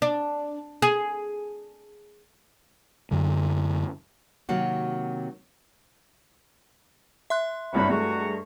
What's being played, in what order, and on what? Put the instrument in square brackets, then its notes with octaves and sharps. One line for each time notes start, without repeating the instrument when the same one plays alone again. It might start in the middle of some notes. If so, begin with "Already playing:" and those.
[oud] D4
G#4
[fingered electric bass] F#2 D3 F#3
[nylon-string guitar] C3 D#3 F#3 A#3 F#4
[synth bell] E5 C6 F#6
[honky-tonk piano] G1 C2 G2 [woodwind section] F#4 C#5 B5
[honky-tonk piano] G2 G#3 A3 [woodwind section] F#4 A#5 C#6